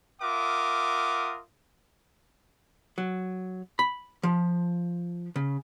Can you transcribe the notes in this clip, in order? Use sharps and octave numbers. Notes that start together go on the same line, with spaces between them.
F4 A#4 E5 F#5 D6 D#6
F#3
B5
F3
C#3